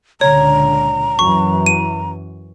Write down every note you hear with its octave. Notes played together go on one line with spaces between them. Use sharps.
C#2 A#2 D3 C#5 A#5
F#2 E3 C#6
D#7